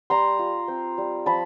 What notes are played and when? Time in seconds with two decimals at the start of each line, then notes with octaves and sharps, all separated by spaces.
0.10 G3 A#5 C6
0.39 F4
0.68 C4
0.98 G3
1.26 F3 A5 B5